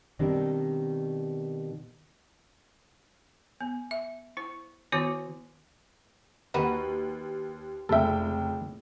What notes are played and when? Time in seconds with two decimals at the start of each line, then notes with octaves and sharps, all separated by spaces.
0.19 B2 D#3 G3 C4 D4
3.61 B3
3.91 E5
4.37 E4 C5
4.92 D#3 B3 E4 F#4 C#5 D6
6.54 D#2 D#4 F#4 B4
7.89 F1 C#2 A4 E5 G5